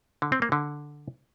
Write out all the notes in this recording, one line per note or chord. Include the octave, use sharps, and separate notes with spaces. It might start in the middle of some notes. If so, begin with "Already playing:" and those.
D3
C4
A#3
D3